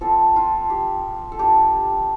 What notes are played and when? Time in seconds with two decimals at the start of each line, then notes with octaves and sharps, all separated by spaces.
0.01 F3 C4 F4 A4
0.36 F4
0.70 G4
1.32 A4
1.39 G3 D4 F4 G4